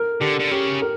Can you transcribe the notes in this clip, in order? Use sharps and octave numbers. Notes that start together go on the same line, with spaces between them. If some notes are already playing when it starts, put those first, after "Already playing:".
Already playing: A#4
D3 G4
D3
C#3 G4
A#4